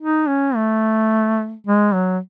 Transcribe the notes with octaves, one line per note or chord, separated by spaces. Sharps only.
D#4
C#4
A3
G#3
F#3